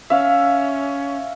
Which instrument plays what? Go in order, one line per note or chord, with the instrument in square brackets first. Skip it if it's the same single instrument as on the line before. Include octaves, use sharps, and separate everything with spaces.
[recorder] C#4 [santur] E5 F5